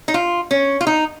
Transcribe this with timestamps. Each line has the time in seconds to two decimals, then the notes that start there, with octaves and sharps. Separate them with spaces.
0.08 D#4
0.14 F4
0.51 C#4
0.81 F4
0.87 D#4